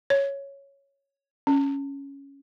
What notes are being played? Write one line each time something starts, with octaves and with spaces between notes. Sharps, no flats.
C#5
C#4